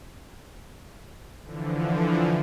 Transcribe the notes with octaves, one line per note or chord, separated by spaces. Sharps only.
D3 E3 F3